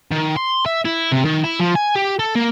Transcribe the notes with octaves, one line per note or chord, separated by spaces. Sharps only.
D#3
C6
E5
E4
C3
D#3
E4
F3
G#5
G4
A4
A#3